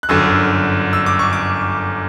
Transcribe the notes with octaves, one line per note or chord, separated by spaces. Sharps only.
F#6
G1 F#2 D3 E6
E6
D6
C#6
D6